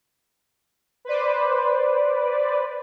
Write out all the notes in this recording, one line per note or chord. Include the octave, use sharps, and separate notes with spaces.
B4 C5 D5